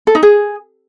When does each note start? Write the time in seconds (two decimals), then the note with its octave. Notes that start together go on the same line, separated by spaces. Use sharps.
0.07 A4
0.15 D#4
0.23 G#4